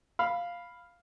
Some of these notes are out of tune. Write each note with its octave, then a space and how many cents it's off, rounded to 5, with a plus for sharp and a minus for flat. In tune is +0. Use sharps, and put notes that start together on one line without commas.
F5 +0 B5 +0